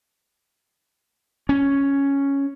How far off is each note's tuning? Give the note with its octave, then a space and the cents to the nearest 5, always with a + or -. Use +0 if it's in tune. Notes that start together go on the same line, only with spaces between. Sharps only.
C#4 +0